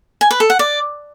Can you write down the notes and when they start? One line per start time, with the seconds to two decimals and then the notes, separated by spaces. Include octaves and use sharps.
0.21 G#5
0.31 B4
0.40 A4
0.50 F#5
0.59 D5